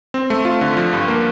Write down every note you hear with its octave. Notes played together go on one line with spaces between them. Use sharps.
C4
A3
F4
D3
F3
G2
A#3